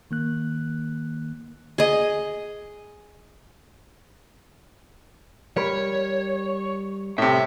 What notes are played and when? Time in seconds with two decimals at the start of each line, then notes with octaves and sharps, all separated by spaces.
0.11 D#3 A#3 F#6
1.78 G#4 D#5
5.57 G3 A#4 C#5 B5
7.18 A2 C3 E5